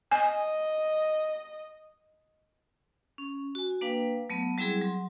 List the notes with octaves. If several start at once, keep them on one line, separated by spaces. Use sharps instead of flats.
D#5 G#5
C#4
F#4 G#5
A#3 D4 B4 F5 G5
F#3 A3 B3
F#3 G3 C4 E4 G#4
F#3 C6